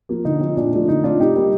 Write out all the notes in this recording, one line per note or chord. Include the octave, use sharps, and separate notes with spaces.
F3 A#3
D3 D#4
F3 C4
A#2 D4
F3 A3
D3 D#4
A3 C4 D4 F4
C3 D#4 G4
G3 A#3